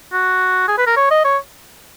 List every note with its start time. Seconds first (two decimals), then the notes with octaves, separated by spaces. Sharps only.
0.12 F#4
0.68 G#4
0.78 B4
0.87 A#4
0.96 C#5
1.11 D#5
1.25 C#5